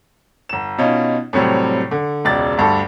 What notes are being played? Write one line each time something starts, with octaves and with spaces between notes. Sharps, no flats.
G1 E7
B2 C#4 D#4 F4
A2 C3 F#3 G3 C4
D3
E1 C#2 D5 A6
D2 G2 A4